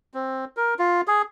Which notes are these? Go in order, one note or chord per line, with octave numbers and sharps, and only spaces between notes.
C4
A#4
F4
G#4